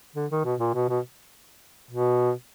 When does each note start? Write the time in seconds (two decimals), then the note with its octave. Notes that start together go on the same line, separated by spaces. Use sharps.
0.16 D3
0.31 D#3
0.45 B2
0.60 A#2
0.74 B2
0.89 B2
1.91 B2